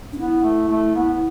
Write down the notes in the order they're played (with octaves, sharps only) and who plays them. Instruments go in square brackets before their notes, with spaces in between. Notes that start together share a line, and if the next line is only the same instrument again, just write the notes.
[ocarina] D4
[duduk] B3 [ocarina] E4
[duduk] A3
A3
B3